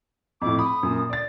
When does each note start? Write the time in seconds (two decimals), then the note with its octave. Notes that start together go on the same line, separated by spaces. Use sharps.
0.42 F2 A2 D6
0.59 B5 D#6
0.83 F#2 A#2
1.10 D5 A6